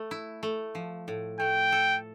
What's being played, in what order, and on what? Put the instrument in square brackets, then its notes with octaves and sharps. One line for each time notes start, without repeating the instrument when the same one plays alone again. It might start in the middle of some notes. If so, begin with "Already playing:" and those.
Already playing: [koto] A3
E4
A3
F3
A2
[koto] A3 [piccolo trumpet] G5
[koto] A4